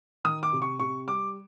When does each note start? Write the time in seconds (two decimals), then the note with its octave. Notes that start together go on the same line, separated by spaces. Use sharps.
0.24 D#3 D#6
0.43 D6
0.53 C3
0.62 C#6
0.80 C3 C#6
1.07 G3 D6